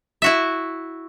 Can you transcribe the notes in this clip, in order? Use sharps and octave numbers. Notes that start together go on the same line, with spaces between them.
E4 F#4 E5